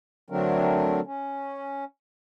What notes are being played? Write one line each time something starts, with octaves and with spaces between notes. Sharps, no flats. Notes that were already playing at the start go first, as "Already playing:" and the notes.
D3 F#3 A3 C4 D4 A#4
C#4